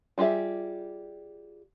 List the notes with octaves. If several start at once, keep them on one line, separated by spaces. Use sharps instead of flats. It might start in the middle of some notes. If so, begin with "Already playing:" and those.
G3 F4 G4 G#4 E5